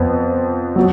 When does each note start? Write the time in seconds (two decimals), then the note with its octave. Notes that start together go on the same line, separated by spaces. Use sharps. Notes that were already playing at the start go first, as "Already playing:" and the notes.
Already playing: F2 F3 B3
0.76 F#3